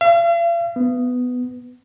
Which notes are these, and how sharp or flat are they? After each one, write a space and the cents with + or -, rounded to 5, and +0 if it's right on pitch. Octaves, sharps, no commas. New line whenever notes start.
F5 -45
B3 +10